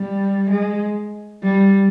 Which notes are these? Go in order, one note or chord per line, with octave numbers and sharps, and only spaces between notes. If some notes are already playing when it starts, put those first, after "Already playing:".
Already playing: G3
G#3
G3